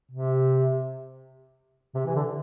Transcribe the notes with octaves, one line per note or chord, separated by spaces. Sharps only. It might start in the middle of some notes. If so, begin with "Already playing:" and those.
C3
C3
E3
D3